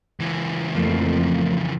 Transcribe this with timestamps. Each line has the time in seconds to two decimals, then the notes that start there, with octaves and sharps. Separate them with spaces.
0.20 C#2 E3
0.75 F2 F3 A3 A#3